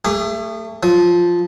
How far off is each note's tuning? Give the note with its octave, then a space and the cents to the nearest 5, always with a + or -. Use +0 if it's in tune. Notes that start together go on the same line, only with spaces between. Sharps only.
A3 +25 G#4 -30 D6 +0
F3 +0 D#6 +30